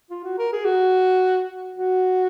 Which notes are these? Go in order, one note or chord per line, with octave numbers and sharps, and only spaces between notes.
F4
F#4
A#4
G#4
F#4
F#4